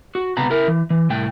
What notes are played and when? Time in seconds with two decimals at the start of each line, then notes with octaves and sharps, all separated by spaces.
0.15 F#4
0.37 C#2 C3 B3 A#5 B5
0.51 E4 A#4
0.68 E3
0.90 E3
1.10 C2 A2 A3 G5